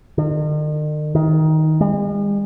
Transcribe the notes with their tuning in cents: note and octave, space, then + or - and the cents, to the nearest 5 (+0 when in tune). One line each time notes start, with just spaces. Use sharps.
D#3 -45
D#3 +10
G#3 -45